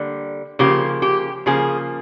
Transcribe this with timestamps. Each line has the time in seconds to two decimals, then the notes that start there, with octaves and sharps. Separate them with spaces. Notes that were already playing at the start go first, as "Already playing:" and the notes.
Already playing: D3 G3 A#3
0.59 C#3 F3 A#3 G4
1.02 G4
1.46 C#3 F3 A#3 G#4